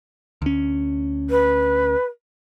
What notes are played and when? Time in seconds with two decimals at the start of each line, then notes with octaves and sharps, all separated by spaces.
0.42 D2 C#4
1.30 B4